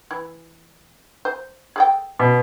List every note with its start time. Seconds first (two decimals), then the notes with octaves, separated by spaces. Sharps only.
0.11 E3
1.25 C5
1.76 G#4 A4 G5
2.19 B2